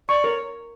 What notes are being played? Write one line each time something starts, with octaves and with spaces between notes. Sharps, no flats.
D5 C#6
A#4 C#5